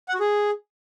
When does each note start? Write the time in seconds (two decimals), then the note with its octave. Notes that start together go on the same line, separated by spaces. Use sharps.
0.09 F#5
0.14 F#4
0.20 G#4